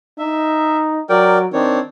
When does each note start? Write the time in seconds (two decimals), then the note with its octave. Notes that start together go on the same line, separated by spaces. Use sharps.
0.18 D#4 E5
1.09 F#3 A#4 D5 G5
1.53 D#3 C4 D4 C#5